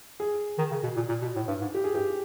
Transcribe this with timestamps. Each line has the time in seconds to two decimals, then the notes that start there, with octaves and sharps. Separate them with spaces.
0.20 G#4
0.59 D#3
0.71 C#3
0.83 B2
0.96 A#2
1.09 A#2
1.22 B2
1.36 A2
1.48 G2
1.61 G#2
1.75 G4
1.84 G#4
1.94 G2 G4